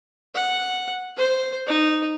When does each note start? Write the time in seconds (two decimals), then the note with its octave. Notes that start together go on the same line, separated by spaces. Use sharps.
0.35 F#5
1.17 C5
1.67 D#4